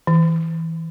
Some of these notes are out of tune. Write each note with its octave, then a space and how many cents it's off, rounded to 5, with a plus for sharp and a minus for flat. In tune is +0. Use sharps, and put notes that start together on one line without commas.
E3 -15